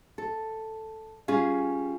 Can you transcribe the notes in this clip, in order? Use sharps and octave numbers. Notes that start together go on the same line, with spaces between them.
A4
G3 C#4 F4 G#4